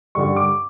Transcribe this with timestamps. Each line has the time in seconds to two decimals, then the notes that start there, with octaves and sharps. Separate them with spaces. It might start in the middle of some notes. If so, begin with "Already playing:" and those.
0.15 G2 D3 G3 C#6
0.36 D6